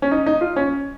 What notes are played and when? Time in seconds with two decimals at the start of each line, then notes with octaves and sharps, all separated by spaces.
0.02 C#4
0.11 D#4
0.26 D#4
0.41 F4
0.56 C#4